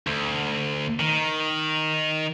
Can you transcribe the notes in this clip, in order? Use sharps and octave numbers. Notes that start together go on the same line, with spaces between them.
D2
D#3